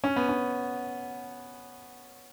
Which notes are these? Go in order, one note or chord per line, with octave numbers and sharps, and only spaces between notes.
C#4
B3
C#4